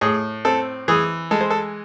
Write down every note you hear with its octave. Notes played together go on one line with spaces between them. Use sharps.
A2 G#4
C4 A4
E3 G#4
G#3 A4
C5
A4